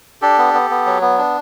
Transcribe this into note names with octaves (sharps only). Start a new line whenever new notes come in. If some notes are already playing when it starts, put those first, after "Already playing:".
D4 G4 A4
B3
B3
B3
F#3
B3
D4